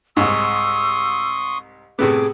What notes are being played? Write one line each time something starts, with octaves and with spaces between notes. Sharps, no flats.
C2 G#2 C6 C#6 D#6 E6
A2 C3 B3 G#4 D6